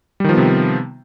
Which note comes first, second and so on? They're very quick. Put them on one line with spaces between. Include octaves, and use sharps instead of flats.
G3 D#3 F3 B3 C3